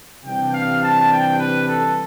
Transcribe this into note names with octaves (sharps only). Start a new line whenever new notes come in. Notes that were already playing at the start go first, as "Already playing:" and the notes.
C3 E3 G3 D4 G5
F5
A5
G5
B4
A4